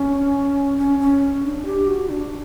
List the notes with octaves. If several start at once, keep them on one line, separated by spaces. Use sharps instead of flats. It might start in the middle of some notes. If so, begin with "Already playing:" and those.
Already playing: C#4
C#4
C#4
D4
G4
F#4
D4